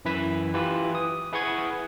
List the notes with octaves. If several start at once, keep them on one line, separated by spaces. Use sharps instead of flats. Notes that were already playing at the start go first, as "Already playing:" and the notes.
F#2 E3 E4 B4 B6
E3 F4 G4 B4
D#6
E4 G#4 B4 F#5 C#6 G#6